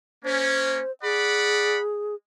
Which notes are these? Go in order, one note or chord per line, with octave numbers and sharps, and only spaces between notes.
A#3 C#4 C5
G#4 D5 F#5 B5